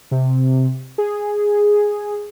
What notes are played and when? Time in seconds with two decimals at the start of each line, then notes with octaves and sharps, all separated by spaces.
0.11 C3
0.98 G#4